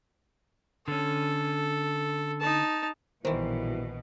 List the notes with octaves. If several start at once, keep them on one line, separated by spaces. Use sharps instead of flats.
D3 C#4 A4
D#4 A5
A#1 B2 D#3 E3 G3 B3 E4 C5